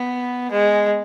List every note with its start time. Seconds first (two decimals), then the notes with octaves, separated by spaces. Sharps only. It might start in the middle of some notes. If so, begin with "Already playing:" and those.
Already playing: B3
0.51 G#3